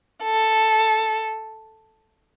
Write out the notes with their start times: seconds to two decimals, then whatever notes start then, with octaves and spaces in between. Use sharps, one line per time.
0.23 A4